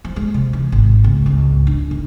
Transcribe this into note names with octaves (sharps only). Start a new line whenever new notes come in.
F3
G#3
C3
E3
G#1
C#2
C#2
D4
D#3